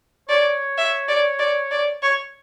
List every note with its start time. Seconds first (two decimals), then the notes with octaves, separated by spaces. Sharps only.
0.29 C#5 D5
0.77 E5
1.09 D5
1.39 D5
1.71 D5
2.03 C#5